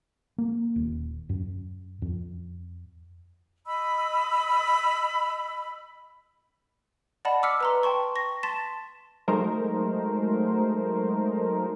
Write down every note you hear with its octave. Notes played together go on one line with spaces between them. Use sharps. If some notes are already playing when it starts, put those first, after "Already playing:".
A#3
D#1
F#2
F2
D#5 B5 E6
D5 D#5 F#5 A5 B5
D6 E6 F6 B6 C#7
B4 A#5 C6
G5 A5 C6 C#6
C#6 A#6
A5 C6 A6 B6 E7
F#3 G#3 A3 D#4 A#4 C5